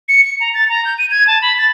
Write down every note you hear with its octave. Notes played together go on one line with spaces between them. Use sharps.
C#7
C#7
A#5
A6
A#5
G6
D#7
G#6
A5
B5
A6